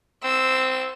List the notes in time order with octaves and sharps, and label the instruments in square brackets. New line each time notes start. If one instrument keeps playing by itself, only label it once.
[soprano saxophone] C4 [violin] E6